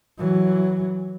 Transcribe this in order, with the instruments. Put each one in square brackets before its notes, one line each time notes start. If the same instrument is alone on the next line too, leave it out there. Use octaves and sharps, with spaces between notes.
[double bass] E3 F#3